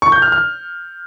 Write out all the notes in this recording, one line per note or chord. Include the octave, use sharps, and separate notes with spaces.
C#6
G6
F6
F6